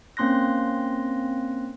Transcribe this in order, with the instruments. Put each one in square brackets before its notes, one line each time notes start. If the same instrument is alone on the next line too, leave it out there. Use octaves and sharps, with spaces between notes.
[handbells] A#3 C4 C#4 C6 F#6 A#6